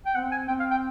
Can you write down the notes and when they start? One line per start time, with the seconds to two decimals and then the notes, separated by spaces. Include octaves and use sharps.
0.06 G5
0.15 C4 F#5
0.32 G#5
0.48 C4 G5
0.60 F5
0.71 G5